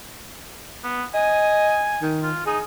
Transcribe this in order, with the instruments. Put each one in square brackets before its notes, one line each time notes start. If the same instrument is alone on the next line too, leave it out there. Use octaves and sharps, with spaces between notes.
[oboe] B3
[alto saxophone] D#5 [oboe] G#5
[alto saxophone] D#3
[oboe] F4
[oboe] D#4 [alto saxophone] G#4